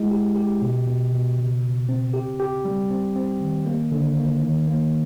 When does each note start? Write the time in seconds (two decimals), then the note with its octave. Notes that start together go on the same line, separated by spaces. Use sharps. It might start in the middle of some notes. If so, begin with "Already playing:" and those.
Already playing: G#3 E4
0.11 G4
0.36 G4
0.62 B2
0.87 B2
1.13 B2
1.38 C#3
1.64 C#3
1.89 C4
2.14 G4
2.40 G4
2.65 G3
2.90 C4
3.16 C4
3.41 D#3
3.66 A#3
3.92 D3
4.17 A#3
4.42 D#3
4.67 A#3